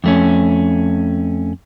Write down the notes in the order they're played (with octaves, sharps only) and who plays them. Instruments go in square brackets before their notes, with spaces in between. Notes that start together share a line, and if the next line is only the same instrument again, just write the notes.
[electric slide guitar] F2 A3 C#4